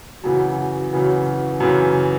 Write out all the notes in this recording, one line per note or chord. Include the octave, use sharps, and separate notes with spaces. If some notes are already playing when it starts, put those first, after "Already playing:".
F#2 C#3 E3 F#4
F#2 C#3 E3 F#4
F#2 C#3 E3